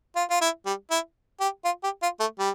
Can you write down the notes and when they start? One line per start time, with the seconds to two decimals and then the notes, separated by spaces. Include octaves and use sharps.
0.16 F4
0.30 F4
0.41 E4
0.66 G3
0.91 E4
1.40 G4
1.65 F4
1.83 G4
2.02 F4
2.20 A3
2.39 G3